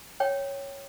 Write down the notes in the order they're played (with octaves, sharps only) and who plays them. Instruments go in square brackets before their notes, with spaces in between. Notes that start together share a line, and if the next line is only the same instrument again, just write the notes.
[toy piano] C#5 G5